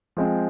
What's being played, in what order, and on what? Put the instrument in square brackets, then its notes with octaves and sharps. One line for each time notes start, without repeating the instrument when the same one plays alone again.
[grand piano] F3 G#3 C4